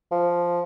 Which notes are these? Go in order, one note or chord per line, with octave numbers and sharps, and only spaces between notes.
F3